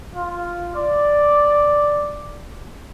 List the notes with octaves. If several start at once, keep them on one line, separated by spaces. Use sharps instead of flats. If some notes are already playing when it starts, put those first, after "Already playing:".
F4
D5